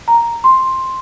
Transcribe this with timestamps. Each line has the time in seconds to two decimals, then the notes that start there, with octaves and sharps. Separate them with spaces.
0.08 A#5
0.44 C6